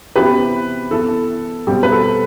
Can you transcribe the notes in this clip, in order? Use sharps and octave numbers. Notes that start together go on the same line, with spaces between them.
C3 E3 B3 G4 B4
E3 B3 A4
B2 G3 C4 G4
B4
A4